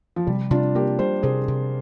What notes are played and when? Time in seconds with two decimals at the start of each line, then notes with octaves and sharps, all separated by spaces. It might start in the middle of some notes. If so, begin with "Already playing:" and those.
0.16 F3
0.27 C3 G3
0.51 C3 D4 F4
0.75 A#3 G4 A#4
0.99 G3 C5
1.23 C3 G#4 C5
1.48 C3